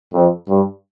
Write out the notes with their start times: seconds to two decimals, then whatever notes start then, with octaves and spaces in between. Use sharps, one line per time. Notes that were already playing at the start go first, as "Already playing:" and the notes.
0.13 F2
0.49 G2